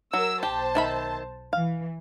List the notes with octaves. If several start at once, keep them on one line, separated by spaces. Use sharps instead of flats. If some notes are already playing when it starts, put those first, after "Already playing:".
F#3 A#4 E6
B1 G4 C5 A5
D#3 E5 B5
E3 F5